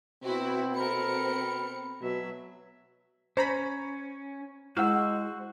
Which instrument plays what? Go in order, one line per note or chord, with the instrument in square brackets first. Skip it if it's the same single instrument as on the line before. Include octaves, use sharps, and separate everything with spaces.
[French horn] B2 [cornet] C4 [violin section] E4 F#4
[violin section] C4 C#7 [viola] A4 A#4 [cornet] B5
[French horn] B2 [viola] F#3 E5
[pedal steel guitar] C#4 [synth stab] C5 A#5 B5
[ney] G#3 [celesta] E4 F#5 [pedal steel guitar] F#4 C5 E6 [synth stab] F5